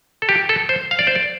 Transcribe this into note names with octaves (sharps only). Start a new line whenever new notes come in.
A4
G4
A4
C5
F5
D5
C5
D5